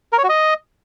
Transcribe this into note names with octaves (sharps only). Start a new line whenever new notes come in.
A#4
C#5
F#4
D#5